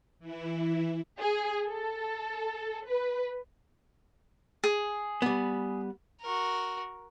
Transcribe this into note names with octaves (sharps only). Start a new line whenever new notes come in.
E3 E4
G#4
A4
B4
G#4
G3 B3
F#4 A#4